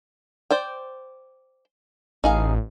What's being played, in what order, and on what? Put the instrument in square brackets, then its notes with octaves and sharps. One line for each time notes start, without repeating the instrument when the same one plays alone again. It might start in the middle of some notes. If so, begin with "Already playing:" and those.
[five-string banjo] C5 D5 G5
[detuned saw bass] A1 [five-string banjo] D#4 G#4 F5